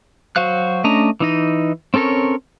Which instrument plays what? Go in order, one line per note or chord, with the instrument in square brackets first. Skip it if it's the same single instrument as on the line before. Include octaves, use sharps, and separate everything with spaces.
[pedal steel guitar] F#3 F#4 C5 F5 F#6
A3 C#4 D4 D#5 A#5
E3 D#4 D#5
C4 C#4 A4 A#4 C#5